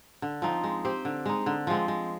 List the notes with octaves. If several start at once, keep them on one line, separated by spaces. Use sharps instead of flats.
D3
F3 C4 D#4
G#3
C4 G4 C5
D3
G#3 D#4
D3
F3 G#3 C4
G#3